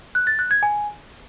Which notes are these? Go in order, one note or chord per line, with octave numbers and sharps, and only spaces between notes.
F#6
A6
F#6
G#6
G#5